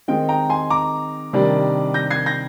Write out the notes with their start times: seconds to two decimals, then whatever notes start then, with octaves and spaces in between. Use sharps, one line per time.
0.08 D#3 G#3 C4 D#4 G5
0.29 G5 A#5
0.50 G#5 C6
0.70 A#5 D6
1.33 C3 D#3 G3 D4
1.94 G6 A#6
2.11 G#6 C7
2.26 G6 A#6